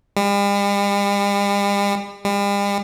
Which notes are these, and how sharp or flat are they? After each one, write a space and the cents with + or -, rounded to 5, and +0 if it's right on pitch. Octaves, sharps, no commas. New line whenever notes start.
G3 +45
G3 +45